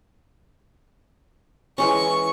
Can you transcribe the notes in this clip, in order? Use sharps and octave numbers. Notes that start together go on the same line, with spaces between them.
E3 G#3 C#4 C#6